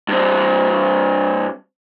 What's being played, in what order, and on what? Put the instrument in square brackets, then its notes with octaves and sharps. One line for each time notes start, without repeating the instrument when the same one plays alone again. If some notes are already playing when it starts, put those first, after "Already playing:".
[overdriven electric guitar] G2 C4